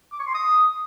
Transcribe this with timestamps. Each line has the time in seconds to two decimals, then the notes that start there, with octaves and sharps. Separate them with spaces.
0.12 D6
0.19 C#6
0.27 C6
0.34 D#6